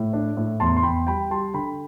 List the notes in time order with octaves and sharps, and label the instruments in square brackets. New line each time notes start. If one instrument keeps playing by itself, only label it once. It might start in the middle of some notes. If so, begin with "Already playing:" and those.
Already playing: [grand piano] A2
D4
A2
E2 A5 C6
C6
E2 G5 B5
G3 G5 B5
G3 A5 C6
D3 G5 B5